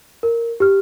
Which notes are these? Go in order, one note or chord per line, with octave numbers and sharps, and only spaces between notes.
A#4
G4 F6